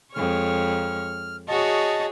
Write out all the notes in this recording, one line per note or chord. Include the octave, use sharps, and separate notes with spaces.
F2 G#3 C#5 F6
F#4 G#4 C#5 D#5 A5